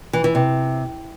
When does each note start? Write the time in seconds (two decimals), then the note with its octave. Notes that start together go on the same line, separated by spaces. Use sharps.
0.13 E3
0.24 E3
0.35 C3